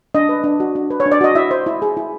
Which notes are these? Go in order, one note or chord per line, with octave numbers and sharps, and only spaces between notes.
D4 D#5
B4
D4
F#4
D4
B4
C#5
D4
D5
F#4 D#5
E4 E5
C5
E4
G#4
E4